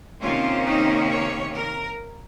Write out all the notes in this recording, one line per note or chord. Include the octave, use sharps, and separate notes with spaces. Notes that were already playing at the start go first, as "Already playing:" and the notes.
C3 D#3 A#3 C#4 F4
D#4
C#5
A#4